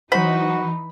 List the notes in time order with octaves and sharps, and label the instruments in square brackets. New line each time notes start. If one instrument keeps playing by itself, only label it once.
[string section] E3 D#4 [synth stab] F#3 C5 [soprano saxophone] F#4 [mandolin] B5